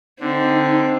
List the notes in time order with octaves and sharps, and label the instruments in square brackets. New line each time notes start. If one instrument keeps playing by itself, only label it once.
[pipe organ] D3 [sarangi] C4 [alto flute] D#4